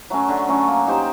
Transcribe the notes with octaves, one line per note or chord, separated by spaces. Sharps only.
F#3 A3 C#4
D3
F#3 A3 C#4
A#3
D#4 G4 C5